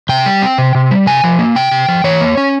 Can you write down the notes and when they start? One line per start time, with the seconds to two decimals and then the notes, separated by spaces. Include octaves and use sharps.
0.09 C3 G5
0.26 G3
0.42 C4
0.58 C3
0.75 C3
0.91 G3
1.06 C3 G#5
1.24 F3
1.39 A#3
1.56 C3 G5
1.71 C3
1.88 F3
2.04 E3 C#5
2.21 A#3
2.37 C#4